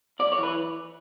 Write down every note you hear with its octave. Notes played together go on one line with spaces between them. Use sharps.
B1 D5
C#5
E3
B4